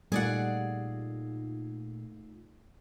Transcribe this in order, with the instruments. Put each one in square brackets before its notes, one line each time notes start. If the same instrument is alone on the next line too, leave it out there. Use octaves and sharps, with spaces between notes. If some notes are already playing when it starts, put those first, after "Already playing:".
[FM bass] A#2 [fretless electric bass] G3 [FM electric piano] A3 D#4 F4 [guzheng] G#4 D5 F#5